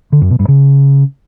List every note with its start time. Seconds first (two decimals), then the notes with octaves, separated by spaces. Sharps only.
0.12 D3
0.21 F#2
0.30 B2
0.39 G2
0.48 C#3